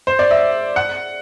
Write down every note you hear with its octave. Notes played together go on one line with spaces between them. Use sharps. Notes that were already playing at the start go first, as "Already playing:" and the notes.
C5
D5
E5
F#5